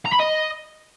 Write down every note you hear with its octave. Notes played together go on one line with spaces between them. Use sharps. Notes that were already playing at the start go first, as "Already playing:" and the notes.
A#5
B5
D#5